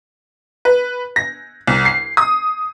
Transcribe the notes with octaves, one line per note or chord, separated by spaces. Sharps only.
B4
A#6
C2
C7
D#6